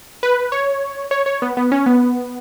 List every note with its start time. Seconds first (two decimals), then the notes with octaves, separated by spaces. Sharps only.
0.23 B4
0.52 C#5
1.11 C#5
1.26 C#5
1.42 B3
1.57 B3
1.72 C#4
1.86 B3